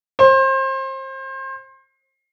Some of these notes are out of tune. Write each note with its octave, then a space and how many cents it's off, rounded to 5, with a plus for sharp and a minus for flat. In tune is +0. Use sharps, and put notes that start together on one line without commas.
C5 +30